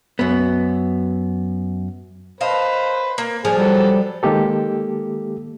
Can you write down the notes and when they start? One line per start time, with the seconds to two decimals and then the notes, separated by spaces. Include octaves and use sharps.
0.19 F#2 B3
2.41 B4 C5 D#5 F5 A5
3.18 A#3
3.45 F3 D4 G#4 G#5
3.58 F#3 G3 A4
4.23 D#3 G#3 A#3 G4 A4